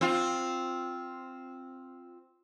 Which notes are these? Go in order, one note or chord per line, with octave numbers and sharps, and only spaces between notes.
C4 F4